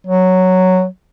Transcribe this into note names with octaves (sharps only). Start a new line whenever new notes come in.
F#3